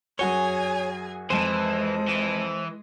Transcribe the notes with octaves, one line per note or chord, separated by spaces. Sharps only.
F#2 F#4 G#4 C#5 G#5 G7
F2 E3 G#3 C5 D#7
E3